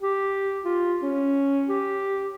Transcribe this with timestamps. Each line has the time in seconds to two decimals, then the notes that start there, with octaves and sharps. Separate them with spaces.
0.02 G4
0.65 F4
1.02 C#4
1.69 G4